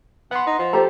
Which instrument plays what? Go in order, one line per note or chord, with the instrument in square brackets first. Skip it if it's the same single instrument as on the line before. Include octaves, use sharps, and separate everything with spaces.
[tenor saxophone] B3 [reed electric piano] F#5 C6
[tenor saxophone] D#4
F3
[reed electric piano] G4 A4 [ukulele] C5 A#5